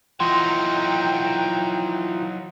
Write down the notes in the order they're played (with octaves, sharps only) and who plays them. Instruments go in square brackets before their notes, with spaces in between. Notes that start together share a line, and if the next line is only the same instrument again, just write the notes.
[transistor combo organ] E3 F4 [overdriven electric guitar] F#3 D#4 [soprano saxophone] G5 [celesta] C6